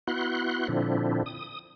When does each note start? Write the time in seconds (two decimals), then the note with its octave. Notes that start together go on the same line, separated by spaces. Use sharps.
0.07 B3 E4 F#4 C6 F#6
0.68 A#2 D3 F3 C4 D4 E4
1.26 D#6